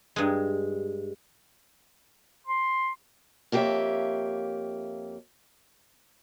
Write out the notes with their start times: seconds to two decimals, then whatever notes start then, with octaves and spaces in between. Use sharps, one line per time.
0.16 G2 G#3
2.47 C6
3.52 F2 A#3 G4 G#4 C#5 E5